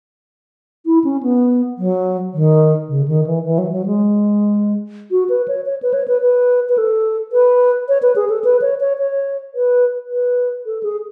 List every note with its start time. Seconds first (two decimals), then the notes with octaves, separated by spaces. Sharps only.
0.86 E4
1.04 C#4
1.23 B3
1.78 F#3
2.33 D#3
2.89 C#3
3.08 D#3
3.26 E3
3.45 E3
3.58 F#3
3.73 F#3
3.86 G#3
5.11 F#4
5.29 B4
5.48 C#5
5.66 C#5
5.82 B4
5.94 C#5
6.08 B4
6.21 B4
6.69 B4
6.78 A4
7.32 B4
7.89 C#5
8.02 B4
8.16 G#4
8.29 A4
8.44 B4
8.62 C#5
8.81 C#5
8.99 C#5
9.55 B4
10.10 B4
10.66 A4
10.83 G#4